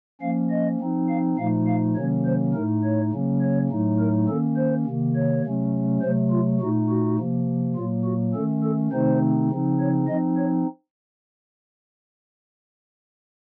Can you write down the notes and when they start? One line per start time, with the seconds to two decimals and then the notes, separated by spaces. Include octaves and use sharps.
0.21 F3 A#3 C#4 F5
0.50 D#5
0.80 F3 C4 D#4
1.09 F5
1.38 A#2 F3 A3 D#4 F5
1.67 F5
1.96 C3 D#3 F#3 A#3 C#4 C#5
2.25 C5
2.53 A2 A3 D#4 A#4
2.83 C#5
3.12 C#3 F#3 A#3 C#4
3.41 C#5
3.70 A2 F#3 A3 D#4
3.99 A#4
4.28 D#3 A#3 C#4 A4
4.57 C5
4.86 C3 D#3 A#3
5.15 C#5
5.44 C3 F#3 A3 C#4
6.02 C3 F#3 A3 C5
6.31 F4
6.60 A#2 A3 D#4 F#4
6.89 F#4
7.18 C3 F3 A#3
7.76 A#2 F#3 A#3 F4
8.05 F#4
8.34 D#3 A3 C#4 A4
8.63 A4
8.92 C3 D#3 A3 C4 D#4 C5
9.50 C#3 F3 C4 D#4
9.80 C#5
10.08 F3 C4 D#4 D#5
10.37 C#5